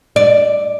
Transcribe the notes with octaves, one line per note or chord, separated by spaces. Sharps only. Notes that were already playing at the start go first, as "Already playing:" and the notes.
D5